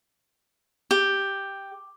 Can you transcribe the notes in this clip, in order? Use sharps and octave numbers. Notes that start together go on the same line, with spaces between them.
G4